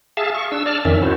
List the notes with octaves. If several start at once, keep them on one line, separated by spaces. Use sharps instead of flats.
G#4 E5 F5 A5
C#6
D4 E6
D5 A5 F6
F2 D#3 C#4 E5
E4 F#4 C5